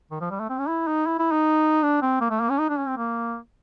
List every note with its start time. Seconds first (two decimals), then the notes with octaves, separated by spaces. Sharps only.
0.11 D#3
0.21 F3
0.30 G3
0.40 A3
0.50 C4
0.59 C#4
0.68 E4
0.87 D#4
1.07 E4
1.19 E4
1.32 D#4
1.83 D4
2.02 C4
2.21 A#3
2.30 A3
2.40 A#3
2.50 C#4
2.59 D#4
2.69 D4
2.78 C#4
2.87 C4
2.98 A#3